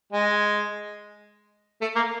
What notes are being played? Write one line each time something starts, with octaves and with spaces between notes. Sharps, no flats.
G#3
A3
A#3